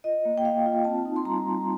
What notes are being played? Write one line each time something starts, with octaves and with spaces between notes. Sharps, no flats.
F4 D#5
A#3
G5
A#3 F5
F4
C4 A5
D#4
C6
G3 A#5
G3